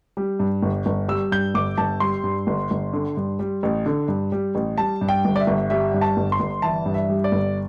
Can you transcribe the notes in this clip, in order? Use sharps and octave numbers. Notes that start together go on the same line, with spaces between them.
G3
G2
G1
G1
G3 E6
G2 G6
G1 D6
G1 A5
G3 C6
G2
G1
G1
D3
G2
G3
A1
D3
G2
G3
A1
G3 A5
G2
G5
G1
D5
E5
G1
G3 E5
G2
A5
G1
C6
G1
E3 A5
G2
E5
G3
D5
G1